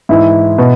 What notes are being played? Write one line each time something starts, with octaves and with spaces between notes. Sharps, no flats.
G#2 E3 E4
B2